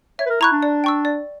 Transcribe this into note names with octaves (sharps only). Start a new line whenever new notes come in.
C#5 E5
B4
A#4
E4 A#5 C#6 F#6
D4
D5
G5 C#6 E6
D5